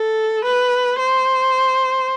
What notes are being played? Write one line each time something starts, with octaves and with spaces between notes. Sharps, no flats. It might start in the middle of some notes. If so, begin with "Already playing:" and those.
Already playing: A4
B4
C5